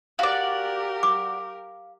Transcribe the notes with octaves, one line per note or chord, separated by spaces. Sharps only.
F#4 G4 A#4 D5 F5
D6